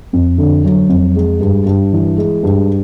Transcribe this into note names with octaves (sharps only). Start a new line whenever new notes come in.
F2
D3
F#3
F2
G#3
G2
G2
E3
G#3
G2